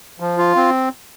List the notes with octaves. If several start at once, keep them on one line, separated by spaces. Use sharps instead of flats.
F3
F4
C4